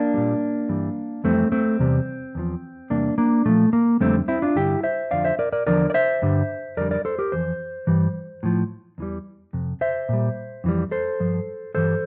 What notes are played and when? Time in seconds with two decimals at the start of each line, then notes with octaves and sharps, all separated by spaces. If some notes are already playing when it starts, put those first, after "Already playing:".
Already playing: A#3 D4
0.14 A#2 G3
0.69 G2 E3 G3
1.24 F2 E3 G3 A3 C4
1.52 A3 C4
1.79 E2 C3 G3
2.35 E2 D3 F3
2.90 E2 C3 G3 A#3 D4
3.18 A#3 D4
3.45 A#2 F3 A3
3.73 A#3
4.01 F2 D3 G3 A3 C4
4.28 C4 E4
4.42 D4 F4
4.55 G2 D3 G3 E4 G4
4.83 C5 E5
5.11 F2 D3 F3 D5 F5
5.24 C5 E5
5.39 A#4 D5
5.52 A#4 D5
5.67 E2 D3 F3 A#4 D5
5.90 D5
5.94 C5 E5
6.22 G2 D3 G3
6.77 F2 D3 G3 A#4 D5
6.91 A#4 D5
7.05 A4 C5
7.19 G4 A#4
7.32 F2 E3 C5
7.87 G2 E3 G3
8.43 A2 F3
8.98 E2 E3 G3
9.53 F2 C3
9.81 C5 E5
10.09 A#2 G3
10.64 F2 E3 G3
10.91 A4 C5
11.20 G2 F3
11.75 G2 E3 G3 A4 C5